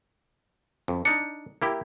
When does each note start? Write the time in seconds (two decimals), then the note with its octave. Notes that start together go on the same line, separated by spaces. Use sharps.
0.88 F2
1.05 D4 D#4 C#7
1.62 A#3 E4 G4